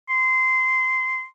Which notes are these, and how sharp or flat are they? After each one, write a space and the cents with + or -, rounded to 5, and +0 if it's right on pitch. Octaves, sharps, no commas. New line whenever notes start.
C6 -15